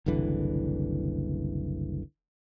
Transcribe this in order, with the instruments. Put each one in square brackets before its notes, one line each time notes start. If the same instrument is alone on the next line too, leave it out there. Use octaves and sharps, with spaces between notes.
[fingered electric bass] F#1 C2 D3 E3